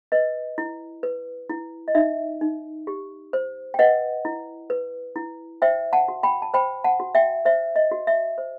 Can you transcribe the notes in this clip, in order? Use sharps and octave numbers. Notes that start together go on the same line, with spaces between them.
B4 D#5
E4
B4
E4
D#5
D#4 E5
D#4
G4
C5
G5
B4 D#5 F#5
E4
B4
E4
C5 E5 G5
F#5 A5
F#4
G5 B5
A5
C5 G5 B5
F#5 A5
F#4
E5 G5
C5 E5
D#5
F#4
E5
C5